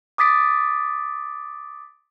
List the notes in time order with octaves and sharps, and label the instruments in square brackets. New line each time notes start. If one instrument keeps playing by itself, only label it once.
[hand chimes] D6 D#6 A6 B6 D7